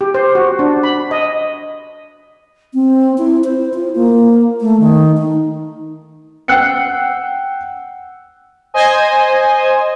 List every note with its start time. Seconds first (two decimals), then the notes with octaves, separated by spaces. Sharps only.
0.01 G4
0.14 C5
0.35 F#4
0.59 D4
0.83 B5
1.11 D#5
2.74 C4
3.18 E4
3.44 C5
3.74 F4
3.95 A#3
4.61 A3
4.80 D#3
5.18 D#4
6.48 F#5 G5 E6 F#6 C7 C#7
8.74 C5 D#5 G#5